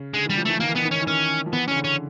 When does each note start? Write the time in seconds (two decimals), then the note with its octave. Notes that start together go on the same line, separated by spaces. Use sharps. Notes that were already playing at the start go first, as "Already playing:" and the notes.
Already playing: C#3
0.14 D3 G#3
0.26 E3 G3
0.37 F3
0.45 E3 A3
0.60 D#3 A#3
0.69 E3
0.75 D#3 B3
0.85 E3
0.91 D#3 C#4
1.02 E3
1.07 D#3 C#4
1.46 F3
1.53 E3 B3
1.68 C#3 C#4
1.76 D3
1.84 C#4